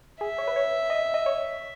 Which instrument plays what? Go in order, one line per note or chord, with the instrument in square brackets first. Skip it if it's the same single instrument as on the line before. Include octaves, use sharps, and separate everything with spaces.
[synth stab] G#4 [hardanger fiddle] E5
[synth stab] C#5
B4
C#5
D#5
D#5
C#5